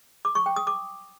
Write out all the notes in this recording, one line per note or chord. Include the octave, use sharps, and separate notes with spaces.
D6
C#6
G5
D#6
D6